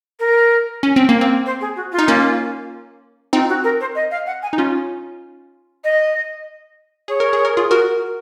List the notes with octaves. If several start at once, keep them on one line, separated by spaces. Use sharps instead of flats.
A#4
C#4
C4
A#3
C4
C5
G#4
F#4
F4
D#4
A#3 C#4
C4 D#4 F4
F#4
A#4
C5
D#5
F5
F#5
G#5
D#4
C#4 F4
D#5
G#4 C#5
A#4
G#4
A#4
F4 G#4
F#4 A#4